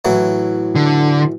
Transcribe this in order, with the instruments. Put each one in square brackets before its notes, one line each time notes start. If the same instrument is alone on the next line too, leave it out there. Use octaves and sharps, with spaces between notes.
[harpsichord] A2 E3 F#3
[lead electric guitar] D3